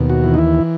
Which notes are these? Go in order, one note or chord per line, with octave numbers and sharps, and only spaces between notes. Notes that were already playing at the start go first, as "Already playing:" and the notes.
Already playing: D#2 B2
F#4
E3
D#4
E4